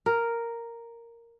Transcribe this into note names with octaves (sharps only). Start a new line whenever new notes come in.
A#4